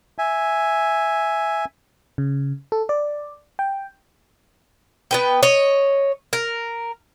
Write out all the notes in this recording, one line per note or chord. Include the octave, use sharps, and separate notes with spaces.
E5 G#5
C#3
A4
D5
G5
B3 B4 G5
C#5 D#5
A#4